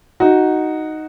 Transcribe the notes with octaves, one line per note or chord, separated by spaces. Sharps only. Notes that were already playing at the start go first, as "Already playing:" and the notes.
D#4 F#4